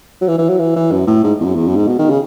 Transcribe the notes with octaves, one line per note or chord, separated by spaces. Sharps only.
F#3
E3
E3
F#3
E3
E3
F#2
A2
G#2
E2
F#2
E2
F#2
G#2
B2
D#3
C#3